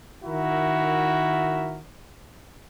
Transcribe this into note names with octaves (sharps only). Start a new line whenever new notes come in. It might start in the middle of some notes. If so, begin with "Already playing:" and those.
D#3 E4 F#4 A#4 E5